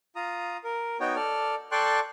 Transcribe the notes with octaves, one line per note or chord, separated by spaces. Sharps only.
F4 A#5 D#6
A#4
B3 D#4 F#4 C#5 G5
A4 D5 F6
A4 D5 G5 C6 C#6 F#6